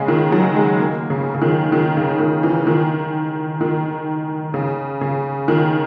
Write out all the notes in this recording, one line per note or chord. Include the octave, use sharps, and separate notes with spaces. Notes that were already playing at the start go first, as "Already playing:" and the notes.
Already playing: C#3 G#3 A#3
D#3
F#3
G#3
A#3
C#3
C#3
D#3
D#3
C#3
D#3
E3
D#3
D#3
C#3
C#3
D#3